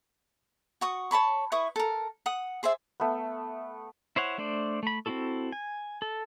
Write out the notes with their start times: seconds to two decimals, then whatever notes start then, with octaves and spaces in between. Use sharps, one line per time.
0.81 F#4 C#6 D#6
1.11 C#5 A5 B5 C#6
1.52 E4 B4 C#6 D#6
1.76 A4 A#4
2.26 F#5 D#6
2.63 G#4 C5 D5 E5
3.00 A3 B3
4.16 E4 C5 C#5 F#5
4.38 A3 D4 C5 D5
4.83 A3 B5
5.06 C4 C#4 E4 F#4 A4
5.52 G#5
6.02 A4